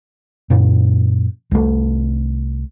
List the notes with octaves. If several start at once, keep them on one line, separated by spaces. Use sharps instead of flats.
F#2 A#2
C2 A3